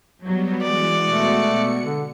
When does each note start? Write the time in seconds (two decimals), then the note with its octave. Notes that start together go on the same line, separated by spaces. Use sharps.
0.24 F#3 G3 B3
0.63 E3 G#3 F#4 D5
1.05 B2 A3 C#7
1.83 D3